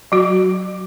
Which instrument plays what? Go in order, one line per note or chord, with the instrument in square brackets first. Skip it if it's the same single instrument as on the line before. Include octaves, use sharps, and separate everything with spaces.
[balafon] F#3 F#4